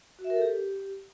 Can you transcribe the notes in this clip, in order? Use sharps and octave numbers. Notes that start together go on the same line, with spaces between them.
F#4
E5
A#4
A4
G4